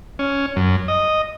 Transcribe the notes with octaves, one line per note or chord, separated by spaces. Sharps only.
C#4
F#2
D#5